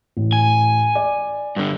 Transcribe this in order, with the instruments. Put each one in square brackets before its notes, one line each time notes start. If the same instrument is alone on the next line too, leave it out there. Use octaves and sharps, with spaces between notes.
[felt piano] A1
[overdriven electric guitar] G#5
[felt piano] D5
[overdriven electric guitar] G2 D3